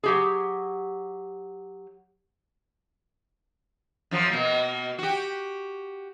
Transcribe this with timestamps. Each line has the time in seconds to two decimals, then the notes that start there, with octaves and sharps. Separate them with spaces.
0.04 F#3 G4 G#4
4.11 F#2 F3 F#3
4.30 B2 A#3
4.98 F#4 G4